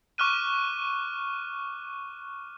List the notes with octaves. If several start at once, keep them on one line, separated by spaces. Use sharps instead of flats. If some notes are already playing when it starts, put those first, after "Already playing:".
C#6 D6 F6 F#6 D#7